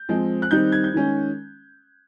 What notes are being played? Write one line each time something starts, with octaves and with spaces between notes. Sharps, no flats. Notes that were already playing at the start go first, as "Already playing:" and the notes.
Already playing: G6
F3 G#3 C4
F#6
D#3 G3 C4 D#4 G6
G#6
G6
D#3 G#3 C#4